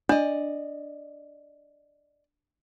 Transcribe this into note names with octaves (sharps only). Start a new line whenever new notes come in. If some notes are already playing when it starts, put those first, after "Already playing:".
D4 D5 D#5